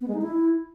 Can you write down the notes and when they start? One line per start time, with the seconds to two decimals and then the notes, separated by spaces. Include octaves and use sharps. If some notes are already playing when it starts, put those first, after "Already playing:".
0.01 B3
0.08 G#3
0.15 D#4
0.22 E4